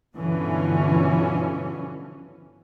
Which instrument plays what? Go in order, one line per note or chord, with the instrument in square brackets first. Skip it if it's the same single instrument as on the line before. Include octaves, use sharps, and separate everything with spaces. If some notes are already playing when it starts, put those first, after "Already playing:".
[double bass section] G2 B2 D3 E3 F3 C#4